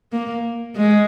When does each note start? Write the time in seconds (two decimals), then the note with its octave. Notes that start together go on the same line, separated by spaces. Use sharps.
0.12 A#3
0.76 G#3